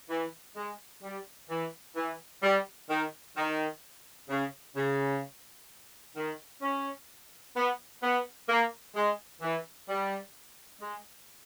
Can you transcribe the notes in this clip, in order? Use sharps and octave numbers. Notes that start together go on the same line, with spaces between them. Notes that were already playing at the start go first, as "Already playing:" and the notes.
E3
G#3
G3
E3
E3
G3
D#3
D#3
C#3
C#3
D#3
C#4
B3
B3
A#3
G#3
E3
G3
G#3